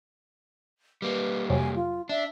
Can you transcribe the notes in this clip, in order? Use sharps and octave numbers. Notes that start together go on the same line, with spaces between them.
G3 A#3 B4
F2 C3 F#3 G#5
F4
D4 E5